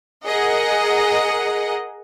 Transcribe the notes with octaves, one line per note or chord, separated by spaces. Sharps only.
G#4 A#4 D#5 F#5